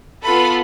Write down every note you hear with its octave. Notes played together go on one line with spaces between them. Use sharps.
B3 F4 A4 B4 B5